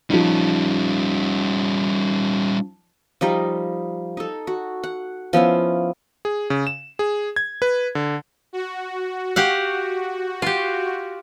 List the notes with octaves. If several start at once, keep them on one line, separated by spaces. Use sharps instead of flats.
F3 G3 C#4 D#4
F3 G3 D#4
D#4 A4
F#4
F#5
F3 B3 C#4 E4
G#4
C#3
E7
G#4
G#6
B4
D3
F#4
G4 F5 F#5
F4 G4